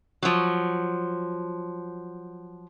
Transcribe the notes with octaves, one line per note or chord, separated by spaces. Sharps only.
F3 F#3